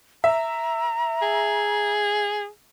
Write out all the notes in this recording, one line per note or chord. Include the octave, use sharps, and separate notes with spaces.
E5 A#5
G#4